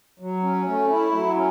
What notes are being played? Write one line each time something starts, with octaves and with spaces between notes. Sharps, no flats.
F#3
C#4
A3
E4
F#3
C#4